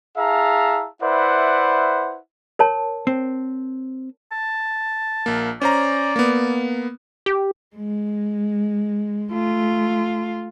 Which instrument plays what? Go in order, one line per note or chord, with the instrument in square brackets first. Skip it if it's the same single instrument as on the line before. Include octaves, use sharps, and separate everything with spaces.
[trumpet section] E4 G#4 E5 F5 A5 A#5
E4 B4 C5 D5 E5 F#5
[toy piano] A#4 C#5 A5
[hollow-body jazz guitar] C4
[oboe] A5
[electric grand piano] A#1 A#3
[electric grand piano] C#4 C5 A#5 [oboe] D5
[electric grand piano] A#3 B3
[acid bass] G4
[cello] G#3
A3 F4